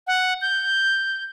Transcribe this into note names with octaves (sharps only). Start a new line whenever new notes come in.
F#5
G6